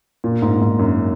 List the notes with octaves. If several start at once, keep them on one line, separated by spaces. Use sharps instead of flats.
A#2
G#2
G#2
F#2